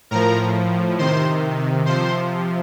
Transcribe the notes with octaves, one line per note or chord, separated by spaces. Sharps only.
A2 F3 A#4 A#5
C3 D#3 C5 C6
C3 F3 C5 C6